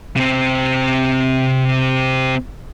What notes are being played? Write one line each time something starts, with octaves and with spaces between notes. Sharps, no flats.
C3 C4